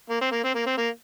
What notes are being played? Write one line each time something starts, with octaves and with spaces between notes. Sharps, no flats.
A#3
C4
A#3
C4
A#3
C4
A#3